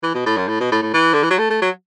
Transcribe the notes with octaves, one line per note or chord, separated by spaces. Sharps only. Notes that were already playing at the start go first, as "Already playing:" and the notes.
E3
B2
A2
F#2
A2
B2
A2
A2
E3
D3
E3
F#3
A3
A3
F#3